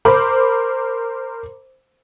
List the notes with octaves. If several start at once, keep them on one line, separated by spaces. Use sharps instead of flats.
A#4 C5 B5 D6